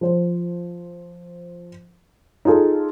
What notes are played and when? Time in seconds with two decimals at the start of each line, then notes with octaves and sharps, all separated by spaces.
0.01 F3 C5
2.45 D#4 F4 G#4 A4